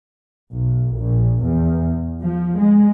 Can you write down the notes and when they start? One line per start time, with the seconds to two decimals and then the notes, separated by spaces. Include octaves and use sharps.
0.52 B1
0.97 A#1
1.44 E2
2.21 F3
2.57 G#3